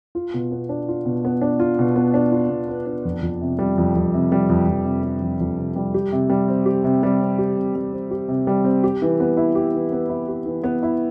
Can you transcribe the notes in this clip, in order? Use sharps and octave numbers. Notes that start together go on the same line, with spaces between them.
F4
B2
B3
D4
F4
B2
B3
D4
F4
B2
B3
D4
F4
B2
B3
D4
F2
F2
C3
G3
F2
F2
C3
G3
F2
F2
C3
G3
F2
F2
C3
G3
G4
C3
G3
C4
G4
C3
G3
C4
G4
C3
G3
C4
G4
C3
G3
C4
G4
E3
B3
E4
G4
E3
B3
E4
G4
E3
B3
E4